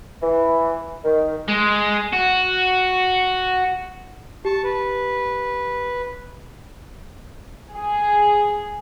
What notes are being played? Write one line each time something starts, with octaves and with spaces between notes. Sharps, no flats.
E3
D#3
G#3
F#4
G4 A5 C#6
B4
G#4